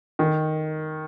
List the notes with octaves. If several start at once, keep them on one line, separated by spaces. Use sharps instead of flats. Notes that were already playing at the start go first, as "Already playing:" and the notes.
D#3